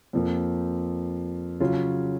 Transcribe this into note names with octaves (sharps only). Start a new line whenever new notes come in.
F2 F3 A#3
C#3 F#3 C#4 F4